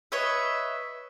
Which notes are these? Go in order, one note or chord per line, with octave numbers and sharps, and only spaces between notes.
B4 C#5 D#5 E5